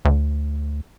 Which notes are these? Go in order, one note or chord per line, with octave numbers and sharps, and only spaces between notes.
D2